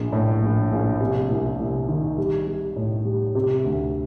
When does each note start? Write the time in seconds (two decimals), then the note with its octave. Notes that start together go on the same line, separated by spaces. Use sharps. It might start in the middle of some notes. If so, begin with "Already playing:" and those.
Already playing: A#1
0.12 A2
0.42 A#1
0.71 A#1
1.00 C3
1.30 C2
1.59 C2
1.88 D#3
2.18 G3
2.47 G3
2.76 A2
3.05 G3
3.35 C3
3.64 D2